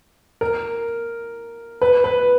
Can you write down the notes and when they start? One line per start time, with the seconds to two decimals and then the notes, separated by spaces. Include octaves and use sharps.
0.41 A#4
1.81 B4
2.04 B4